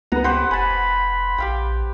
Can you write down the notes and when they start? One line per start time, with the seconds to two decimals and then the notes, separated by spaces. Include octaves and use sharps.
0.12 C#2 B3 B4 F#5 A#5
0.24 G4 B4 C5 F#5
0.51 F1 G#5 A5 B5
1.38 A#1 G4 F5 G5